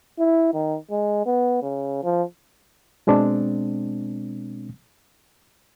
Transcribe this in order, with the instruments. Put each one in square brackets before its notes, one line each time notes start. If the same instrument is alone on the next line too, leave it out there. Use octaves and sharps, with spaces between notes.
[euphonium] E4
D#3
G#3
B3
C#3
F3
[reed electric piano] B2 G#3 C4 D4